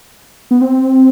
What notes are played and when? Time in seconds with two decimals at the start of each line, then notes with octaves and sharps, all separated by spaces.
0.51 B3
0.61 C4